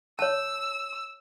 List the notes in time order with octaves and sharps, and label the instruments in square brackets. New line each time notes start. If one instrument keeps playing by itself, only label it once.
[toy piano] C#5 A5 [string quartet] E6